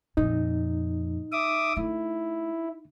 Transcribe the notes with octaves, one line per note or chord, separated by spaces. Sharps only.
F2 A#2 D#4
E5 D6 D#6
A3 E4